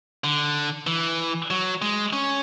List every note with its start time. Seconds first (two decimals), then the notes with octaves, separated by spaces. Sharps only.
0.24 D3
0.87 E3
1.51 F#3
1.82 G#3
2.13 C#4